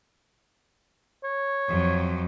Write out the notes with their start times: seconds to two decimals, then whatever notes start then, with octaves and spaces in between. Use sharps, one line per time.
1.24 C#5
1.68 F2 F#3